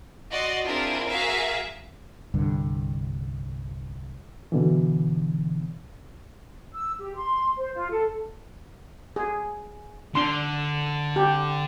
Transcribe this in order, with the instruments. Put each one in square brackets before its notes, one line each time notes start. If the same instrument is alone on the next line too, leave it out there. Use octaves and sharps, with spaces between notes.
[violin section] F#4 D5 D#5 C6
C4 D4 E4 F4 G#4 A#4
F#4 G#4 A#4 E5 F5
[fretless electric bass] C2 G2 D3
[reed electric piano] B2 D3 E3
[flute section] E6
G4
C6
C5
F4
A4
[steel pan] G#4
[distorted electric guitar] D3 [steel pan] D4 C6
[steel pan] G4